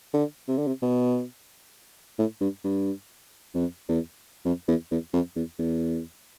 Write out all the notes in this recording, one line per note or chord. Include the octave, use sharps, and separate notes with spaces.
D3
C3
D3
C3
B2
A2
G2
G2
F2
E2
F2
E2
E2
F2
E2
E2